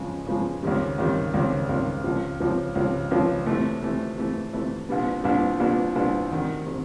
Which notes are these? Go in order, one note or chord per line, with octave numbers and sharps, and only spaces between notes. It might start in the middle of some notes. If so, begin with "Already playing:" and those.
Already playing: C#3 F3 G#3
C#3 F3 G#3
C#2 C3 D#3 G3
C#2 C3 D#3 G3
C#2 C3 D#3 G3
C#2 C3 D#3 G3
C#2 C3 F3
C#2 C3 F3
C#2 C3 F3
C#2 C3 F3
C3 E3 A3
C3 E3 A3
C3 E3 A3
C3 E3 A3
C2 A#2 G3 B3 D4
C2 A#2 G3 B3 D4
C2 A#2 G3 B3 D4
C2 A#2 G3 B3 D4
D2 C3 D#3
C3 D#3